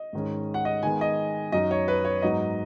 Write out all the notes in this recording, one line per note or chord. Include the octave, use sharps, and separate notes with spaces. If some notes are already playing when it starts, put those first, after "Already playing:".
Already playing: D#5
G#2 D#3 G#3 C#4
F#5
D#5
D#3 G#3 B3 G#5
D#5
F#2 F#3 D#4 D#5
C#5
B4
C#5
G#2 F#3 B3 D#4 D#5